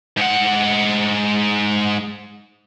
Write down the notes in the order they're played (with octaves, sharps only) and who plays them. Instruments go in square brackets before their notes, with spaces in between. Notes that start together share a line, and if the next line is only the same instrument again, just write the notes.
[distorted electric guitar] G#2 F#5